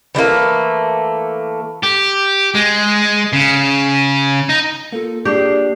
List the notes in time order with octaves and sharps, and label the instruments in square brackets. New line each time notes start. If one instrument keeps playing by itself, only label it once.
[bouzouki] E3 G3 A3 A#3
[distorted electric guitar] G4
G#3
C#3
D#4
[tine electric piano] A#3 F4 [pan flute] A4
[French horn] D4 [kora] G4 [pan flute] G#4